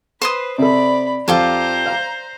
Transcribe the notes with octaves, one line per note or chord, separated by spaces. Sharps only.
B4 C5 C6 D#6
C3 A4 D5 B5
F2 F4 G4 A4 C5 A#5
F5